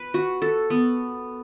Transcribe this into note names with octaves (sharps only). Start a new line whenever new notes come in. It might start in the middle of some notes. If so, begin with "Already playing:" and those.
Already playing: B4
F#4
A4
B3